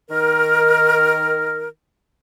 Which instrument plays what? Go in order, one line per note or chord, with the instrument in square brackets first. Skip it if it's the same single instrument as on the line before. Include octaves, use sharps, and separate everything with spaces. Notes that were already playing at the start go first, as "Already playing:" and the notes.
[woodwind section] D#3 A#4